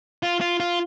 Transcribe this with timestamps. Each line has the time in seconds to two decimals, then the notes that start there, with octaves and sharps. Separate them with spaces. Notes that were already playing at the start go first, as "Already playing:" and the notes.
0.23 F4
0.41 F4
0.60 F4